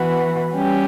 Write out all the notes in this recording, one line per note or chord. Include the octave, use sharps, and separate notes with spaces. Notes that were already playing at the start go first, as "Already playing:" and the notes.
Already playing: E3 B3 F#4
G3 C#4 G4